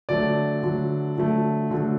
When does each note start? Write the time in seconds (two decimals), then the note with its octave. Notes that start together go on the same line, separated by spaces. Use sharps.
0.09 D3 F#3 A3 D5
0.63 D3 F#3 A3
1.18 D3 F#3 A3
1.70 D3 F#3 A3